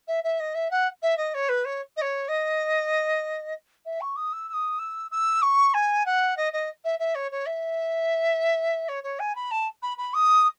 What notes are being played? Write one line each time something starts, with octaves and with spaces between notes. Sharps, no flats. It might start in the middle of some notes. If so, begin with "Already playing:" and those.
E5
E5
D#5
E5
F#5
E5
D#5
C#5
B4
C#5
D#5
C#5
D#5
E5
C#6
D#6
E6
E6
D#6
E6
E6
C#6
G#5
F#5
D#5
D#5
E5
E5
C#5
C#5
E5
C#5
C#5
G#5
B5
A5
B5
B5
D#6